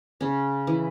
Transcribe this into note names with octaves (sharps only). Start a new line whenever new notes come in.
C#3 C#4
E3